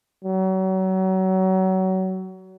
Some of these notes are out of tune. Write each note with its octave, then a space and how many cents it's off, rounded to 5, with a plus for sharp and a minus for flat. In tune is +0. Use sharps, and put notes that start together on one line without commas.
F#3 +30